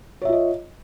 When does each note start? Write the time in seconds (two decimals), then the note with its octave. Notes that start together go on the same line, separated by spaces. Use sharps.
0.22 C#5
0.25 E5
0.29 F4
0.33 D#5